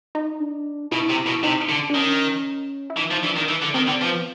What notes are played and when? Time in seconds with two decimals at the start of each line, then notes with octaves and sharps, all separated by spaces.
0.15 D#4
0.40 D4
0.92 B2 E4
1.09 C3
1.26 B2
1.43 C3 D#4
1.69 D3
1.90 D4
1.95 D#3 C#4
2.90 E4
2.97 E3 D#4
3.11 F3
3.23 E3 D4
3.36 D#3
3.49 E3
3.62 D3
3.74 D#3 C4
3.87 D3 C4
4.01 F3 B3